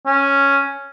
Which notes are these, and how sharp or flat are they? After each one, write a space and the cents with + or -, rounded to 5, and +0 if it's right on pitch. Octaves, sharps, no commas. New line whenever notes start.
C#4 +0